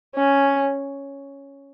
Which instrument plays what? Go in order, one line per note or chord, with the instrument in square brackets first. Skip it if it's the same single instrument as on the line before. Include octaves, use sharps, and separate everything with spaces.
[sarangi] C#4